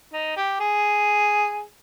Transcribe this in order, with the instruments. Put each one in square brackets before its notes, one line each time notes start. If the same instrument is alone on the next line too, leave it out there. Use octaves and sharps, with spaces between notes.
[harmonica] D#4
G4
G#4